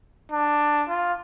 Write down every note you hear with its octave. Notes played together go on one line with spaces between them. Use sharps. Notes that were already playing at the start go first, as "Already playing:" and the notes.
D4
F4